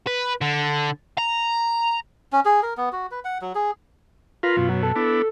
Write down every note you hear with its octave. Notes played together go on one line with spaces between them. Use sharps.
B4
D3
A#5
C#4
G#4
A#4
B3
F#4
B4
F#5
F#3
G#4
F4 A#4 B4 F5
F#2 B2
F#3
A4
B3 D4 E4